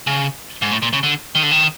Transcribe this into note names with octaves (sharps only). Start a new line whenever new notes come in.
C#3
G#2
A2
A#2
C#3
D3
D#3
D3
D#3